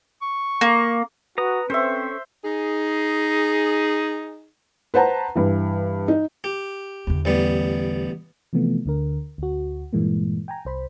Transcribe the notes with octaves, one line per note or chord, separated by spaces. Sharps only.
C#6
A#3
F#4 B4 A#5 D#6
C4 C#4 A4 C5 E5 C#6
D#4 G#4
B4 C5 F#5 A5 A#5
G2 E3
D#4
G4
E2 D3
A1 G3 B3
C3 E3 F3 A3 B3
D2 D3 A#4
D2 F#4
G2 A#2 E3 G#3 A#3
G5 G#5 A#5
C2 C5 B5